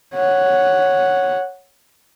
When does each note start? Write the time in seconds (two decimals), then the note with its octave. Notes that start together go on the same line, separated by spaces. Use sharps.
0.14 C#5 F#5